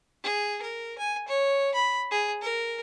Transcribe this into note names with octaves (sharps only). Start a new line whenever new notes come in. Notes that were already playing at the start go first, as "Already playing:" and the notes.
G#4
A#4
G#5
C#5
B5
G#4
A#4